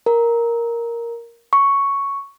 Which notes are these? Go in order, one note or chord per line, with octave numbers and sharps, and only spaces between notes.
A#4
C#6